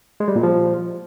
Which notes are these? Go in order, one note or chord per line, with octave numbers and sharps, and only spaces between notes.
G#3
G3
A#2
F3